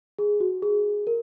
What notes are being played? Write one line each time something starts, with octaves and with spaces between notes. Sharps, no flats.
G#4
F#4
G#4
A#4